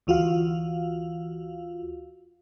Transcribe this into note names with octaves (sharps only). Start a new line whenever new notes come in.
D2 E3 F4 F#4 F5